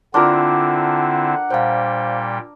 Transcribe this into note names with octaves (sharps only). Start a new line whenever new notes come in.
D3 C4 D4 E4 F4 A#4 F#5 C6
A#2 G3 C5 F5 G5